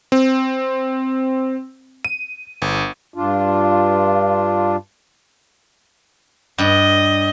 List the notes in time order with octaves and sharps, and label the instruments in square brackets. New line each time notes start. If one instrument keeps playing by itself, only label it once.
[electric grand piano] C4
D#7
G1
[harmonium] G2 D4 F4
[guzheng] G2 [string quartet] D#5